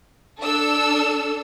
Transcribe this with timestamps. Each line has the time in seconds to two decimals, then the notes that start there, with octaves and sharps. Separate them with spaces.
0.42 D4 A4 E6